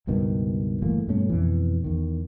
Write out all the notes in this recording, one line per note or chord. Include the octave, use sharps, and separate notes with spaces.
C#2 G2 B2 D#3
G1 E3 A3 A#3
G2 B2 A3 C#4
F2 B2 E3
E2 D#3